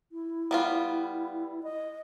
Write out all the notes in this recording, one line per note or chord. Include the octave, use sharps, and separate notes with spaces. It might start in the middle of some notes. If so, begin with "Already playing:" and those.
E4
G3 B3 F4
D#5